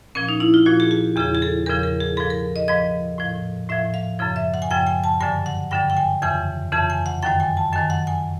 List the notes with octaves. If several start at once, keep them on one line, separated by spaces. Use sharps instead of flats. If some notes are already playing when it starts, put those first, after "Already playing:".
A#2 F3 C#4
D#4
E4
F4
A#2 F3 F#4
G#4
G4
E2 C#3 F3 G#4
G#4
A4
E2 C#3 F3 A#4
A#4
G#4
G#2 F3 A4
A#4
D#5
G#2 F3 D#5
A2 F3
A2 F3 E5
F5
F#2 C#3 F3
E5
F#5
G#5
F#2 C#3 F3 G5
G#5
A5
G2 D3 F#3 G#5
F#5
G2 D3 F#3 G5
G5
G#5
F2 C#3 E3 G#5
F2 C#3 E3 A5
G#5
F#5
F#2 D#3 F#3 G5
G#5
A5
F#2 D#3 F#3 G#5
F#5
G#5